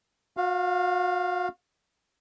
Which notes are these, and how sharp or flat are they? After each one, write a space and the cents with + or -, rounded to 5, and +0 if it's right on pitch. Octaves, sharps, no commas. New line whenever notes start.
F#4 -40 F5 +0